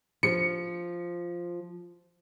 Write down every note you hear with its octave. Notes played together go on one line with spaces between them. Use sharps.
F3 C#7